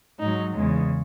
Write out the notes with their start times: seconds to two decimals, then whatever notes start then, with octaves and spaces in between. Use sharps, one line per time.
0.19 G#2 F#3 D#4
0.55 E2 C#3 G#3